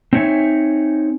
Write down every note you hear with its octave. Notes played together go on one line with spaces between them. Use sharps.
C4 D4 D#4 C#5 E5 G#5